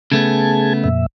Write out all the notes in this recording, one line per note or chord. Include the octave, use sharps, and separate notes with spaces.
C#3 A3 B3 G#4 A5 G#6
F2 A#2 E5